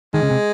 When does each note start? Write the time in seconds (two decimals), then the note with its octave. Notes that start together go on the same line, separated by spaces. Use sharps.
0.14 D#3 G#3
0.23 C#3
0.31 C3